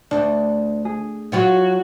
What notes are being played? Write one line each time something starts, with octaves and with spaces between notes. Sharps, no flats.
D2 D4
G#4
F#3 F4 F#4 C#5